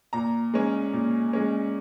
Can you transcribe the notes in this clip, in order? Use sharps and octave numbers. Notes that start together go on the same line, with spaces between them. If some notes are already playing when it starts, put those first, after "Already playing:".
A#2 A#5
G#3 C#4
A#2
G#3 C#4